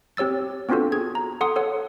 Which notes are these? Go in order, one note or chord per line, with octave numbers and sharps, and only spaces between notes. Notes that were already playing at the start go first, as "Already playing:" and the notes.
C4 G4 C#5 E6 A6
B3 C4 D4 F4 F#4 A4
G#4 G#6
A#5
A4 F#5 C6 D#6
A4 C#5 F#5